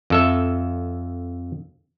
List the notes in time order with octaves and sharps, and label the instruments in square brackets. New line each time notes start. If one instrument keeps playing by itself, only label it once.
[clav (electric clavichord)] F2 A4 E5